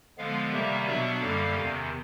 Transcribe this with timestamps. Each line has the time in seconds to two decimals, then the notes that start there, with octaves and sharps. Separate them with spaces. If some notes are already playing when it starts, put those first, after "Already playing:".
0.18 D3 F3 G#3 B3 F5
0.52 C3 D#3 G3 A#3 E5
0.87 B2 F#3 B3 D4 E5
1.21 F#2 D3 G3 A#3 F5
1.55 E2 C3 D#3